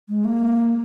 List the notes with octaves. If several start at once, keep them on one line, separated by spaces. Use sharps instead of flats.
G#3
A#3